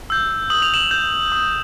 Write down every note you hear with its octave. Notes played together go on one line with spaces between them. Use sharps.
E6 G6
D#6 F#7
F7
E7 F#7
G6
D#6